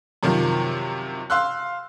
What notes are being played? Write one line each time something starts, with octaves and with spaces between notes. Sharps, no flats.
F#2 C3 D#3 F3
F5 C6 E6 F#6